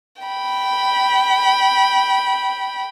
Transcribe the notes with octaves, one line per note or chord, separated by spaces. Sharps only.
G5 B5